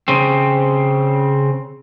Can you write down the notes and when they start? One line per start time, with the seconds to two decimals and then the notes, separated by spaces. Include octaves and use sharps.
0.08 C#3 C4